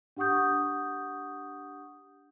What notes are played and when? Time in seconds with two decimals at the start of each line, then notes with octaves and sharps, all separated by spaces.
0.17 D4 G4 F#5 C#6 D#6 G6